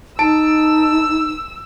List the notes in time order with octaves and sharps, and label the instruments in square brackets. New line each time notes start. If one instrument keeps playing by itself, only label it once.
[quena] D#4 [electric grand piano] A5 D7 [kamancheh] E6